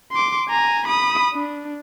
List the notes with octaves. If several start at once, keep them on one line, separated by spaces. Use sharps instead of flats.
C6 D6
G#5 A#5
B5 D#6
D4